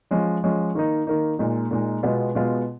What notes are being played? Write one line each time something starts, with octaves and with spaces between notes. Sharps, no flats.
F3 G#3 C#4
F3 G#3 C#4
D#3 A#3 D#4
D#3 A#3 D#4
A#2 G#3 D#4
A#2 G#3 D#4
B2 G#3 B3 F4
B2 G#3 B3 F4